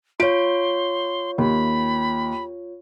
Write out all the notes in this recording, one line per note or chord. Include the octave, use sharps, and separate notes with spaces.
F4 C#5 C6 D7
D#2 B5